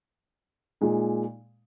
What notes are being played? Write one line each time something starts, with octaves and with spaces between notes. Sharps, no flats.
A#2 G#3 D#4